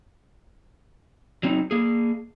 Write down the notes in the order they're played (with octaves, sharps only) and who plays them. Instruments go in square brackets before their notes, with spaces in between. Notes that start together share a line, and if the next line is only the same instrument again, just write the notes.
[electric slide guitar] F#3 C4 D#4
A#3 G#4